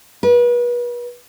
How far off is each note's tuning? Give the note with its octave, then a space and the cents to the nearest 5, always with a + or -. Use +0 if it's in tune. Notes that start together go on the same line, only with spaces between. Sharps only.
B4 -35